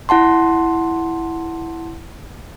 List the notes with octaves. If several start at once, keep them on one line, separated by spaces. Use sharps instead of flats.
E4 F#5 A5 C6